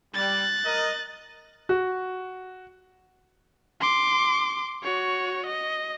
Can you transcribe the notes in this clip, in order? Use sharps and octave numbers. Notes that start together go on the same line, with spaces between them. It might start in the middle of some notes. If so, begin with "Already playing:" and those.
G3 F#6 A6
A#4 D#5
F#4
C6 D6
F#4 C#5
D#5